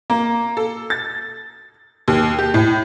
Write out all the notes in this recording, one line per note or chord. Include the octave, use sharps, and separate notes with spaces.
A#3
A4
A6
D#2
G4
A2